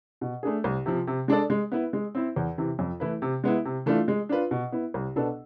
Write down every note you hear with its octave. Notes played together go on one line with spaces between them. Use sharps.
B2
A3 D4 G#4
C2
C3 F3
C3
G#3 D4 A4 D5
G#3
B3 E4 B4
G#3
C4 E4
E2
C3 E3
F2
E3 A3 E4 B4
C3
G#3 B3 E4
C3
E3 A3 D4 F4
G#3
D4 F4 B4
B2
B3 E4
C2
B2 B3 D4 A4